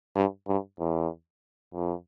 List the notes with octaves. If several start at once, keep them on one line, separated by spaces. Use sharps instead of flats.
G2
G2
E2
F2